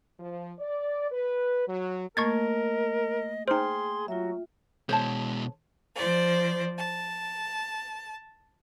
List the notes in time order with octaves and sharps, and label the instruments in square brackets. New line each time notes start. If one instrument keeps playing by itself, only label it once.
[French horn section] F3
D5
B4
F#3
[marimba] A3 A#3 [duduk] A#4 [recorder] D#5 [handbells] C#6 G#6 A6
[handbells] D#4 C5 [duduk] G#4 [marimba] G5 F6 [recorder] C6
[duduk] F#3 [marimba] F4 E5 [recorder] F#4
[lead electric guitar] B2 G#3 [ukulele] C5 C#5 A5
[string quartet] F3 C5 D5
A5